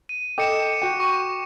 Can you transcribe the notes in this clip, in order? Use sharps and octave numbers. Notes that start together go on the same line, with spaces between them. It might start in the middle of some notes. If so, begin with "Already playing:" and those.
D#7
A4 D#5 G5 D6 C#7 E7
F#4 G5
C#6